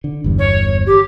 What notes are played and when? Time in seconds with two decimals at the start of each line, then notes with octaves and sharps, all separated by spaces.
0.04 D3
0.24 G1 E2 G2
0.39 C#5
0.86 G4